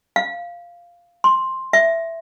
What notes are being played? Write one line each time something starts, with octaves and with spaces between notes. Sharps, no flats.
F5
C6
E5